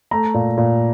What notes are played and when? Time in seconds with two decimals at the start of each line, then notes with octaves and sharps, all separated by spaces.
0.11 A3 A#5
0.34 A#2
0.57 A#2